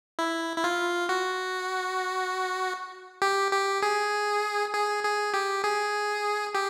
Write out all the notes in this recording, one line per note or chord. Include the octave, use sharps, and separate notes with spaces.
E4
E4
F4
F#4
G4
G4
G#4
G#4
G#4
G4
G#4
G4